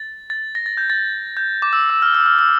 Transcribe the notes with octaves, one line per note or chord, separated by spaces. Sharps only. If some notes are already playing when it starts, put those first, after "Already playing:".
Already playing: A6
A6
A#6
A6
G6
A6
G6
D6
E6
E6
F6
E6
F6
E6